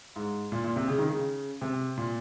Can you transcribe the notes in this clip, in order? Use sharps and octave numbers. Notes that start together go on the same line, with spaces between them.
G#2
A#2
A#2
C3
C#3
D#3
C#3
C3
A#2